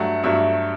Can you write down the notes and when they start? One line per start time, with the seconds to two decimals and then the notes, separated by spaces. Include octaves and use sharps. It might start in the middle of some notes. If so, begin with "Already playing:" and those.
Already playing: G2 F#3 A3 F#5
0.23 G2 F#3 A3 E5